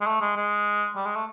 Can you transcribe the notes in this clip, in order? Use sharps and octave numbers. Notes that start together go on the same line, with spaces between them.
G#3
A3
G#3
G#3
G3
G#3
A3